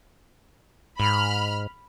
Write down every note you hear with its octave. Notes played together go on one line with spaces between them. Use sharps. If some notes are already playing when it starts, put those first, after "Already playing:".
G#2 B5 F6